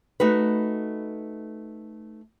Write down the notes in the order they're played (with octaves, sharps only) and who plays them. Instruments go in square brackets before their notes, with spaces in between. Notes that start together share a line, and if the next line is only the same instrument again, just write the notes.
[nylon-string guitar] A3 D#4 F#4 B4